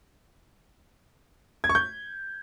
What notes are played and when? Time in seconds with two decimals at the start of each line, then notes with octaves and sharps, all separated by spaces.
1.64 G#6
1.69 C#6
1.75 G6